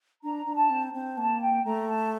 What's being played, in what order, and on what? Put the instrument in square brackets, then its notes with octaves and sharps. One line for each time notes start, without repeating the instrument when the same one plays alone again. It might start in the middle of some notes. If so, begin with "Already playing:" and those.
[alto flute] D4 [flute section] A#5
[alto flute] D4
[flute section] A5
[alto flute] C4
C4
[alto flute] A#3 [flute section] A5
[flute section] G5
[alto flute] A3 [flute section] A#5
[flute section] A5